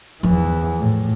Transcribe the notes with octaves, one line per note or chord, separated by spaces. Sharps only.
E2 E3 F3
A2